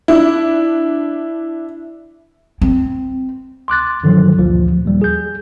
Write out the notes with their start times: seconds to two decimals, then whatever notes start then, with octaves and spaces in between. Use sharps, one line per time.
0.08 D4 E4
2.61 C4
3.68 C6 D6 F#6 A6
4.04 G2 D3 D#3 F3 F#3
4.38 A1 D2 A#2 F3
4.85 D#2 G3
5.02 G#4 G6